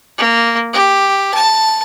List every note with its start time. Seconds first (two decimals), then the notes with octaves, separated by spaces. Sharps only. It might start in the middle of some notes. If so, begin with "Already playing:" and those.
0.18 A#3
0.73 G4
1.34 A5